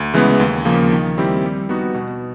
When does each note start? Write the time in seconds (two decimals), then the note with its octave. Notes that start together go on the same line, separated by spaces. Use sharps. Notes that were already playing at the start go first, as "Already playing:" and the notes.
Already playing: D2
0.14 C#3 E3 G#3 B3
0.40 D#2
0.65 C#3 F3 A#3
0.92 D#3
1.17 G3 C4 E4 G4
1.44 G3
1.69 B3 D#4 F#4
1.94 B2